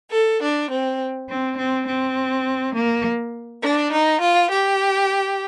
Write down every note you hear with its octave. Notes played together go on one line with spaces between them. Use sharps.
A4
D4
C4
C4
C4
C4
A#3
D4
D#4
F4
G4